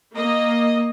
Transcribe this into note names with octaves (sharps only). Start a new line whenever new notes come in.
A#3 D#5